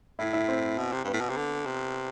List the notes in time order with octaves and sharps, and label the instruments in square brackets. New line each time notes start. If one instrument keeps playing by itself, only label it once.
[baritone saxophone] A2 [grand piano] E4
[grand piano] E4
C4
[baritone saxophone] B2
C3
G2
[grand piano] B3
[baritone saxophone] A2
B2
C3
D3
C3